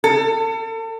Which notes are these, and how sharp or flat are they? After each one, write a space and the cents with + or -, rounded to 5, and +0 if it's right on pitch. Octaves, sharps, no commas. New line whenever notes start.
A4 +35